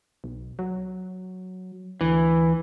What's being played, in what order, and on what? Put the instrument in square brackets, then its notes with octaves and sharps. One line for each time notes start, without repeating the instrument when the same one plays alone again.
[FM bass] B1
F#3
[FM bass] D2 [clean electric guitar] E3